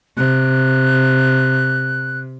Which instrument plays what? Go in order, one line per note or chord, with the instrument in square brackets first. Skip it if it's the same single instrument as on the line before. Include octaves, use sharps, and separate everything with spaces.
[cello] C3 [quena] F#6